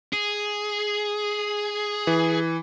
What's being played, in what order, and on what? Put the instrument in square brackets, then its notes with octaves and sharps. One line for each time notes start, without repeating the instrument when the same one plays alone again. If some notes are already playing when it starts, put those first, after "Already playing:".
[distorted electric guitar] G#4
[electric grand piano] E3